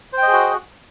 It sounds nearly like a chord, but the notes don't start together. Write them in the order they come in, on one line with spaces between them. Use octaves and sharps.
C5 G5 D#5 G#4 F#4